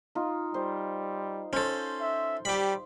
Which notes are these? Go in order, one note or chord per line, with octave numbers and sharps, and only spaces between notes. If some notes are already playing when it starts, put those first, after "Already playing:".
D#4 F4
G3 C5
C#4 A4 C5 C6
E5
G3 G4 B5